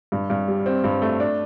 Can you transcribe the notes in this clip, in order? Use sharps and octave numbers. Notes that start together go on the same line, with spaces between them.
G2
G2
G3
C4
G2
A3
D4